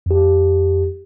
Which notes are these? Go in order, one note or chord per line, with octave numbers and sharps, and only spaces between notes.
F2 G4